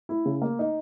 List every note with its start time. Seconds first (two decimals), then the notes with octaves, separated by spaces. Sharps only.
0.09 E4
0.26 C#3
0.42 A#3
0.59 D#4